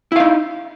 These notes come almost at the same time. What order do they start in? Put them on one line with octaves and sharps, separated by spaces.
E4 F5 D#4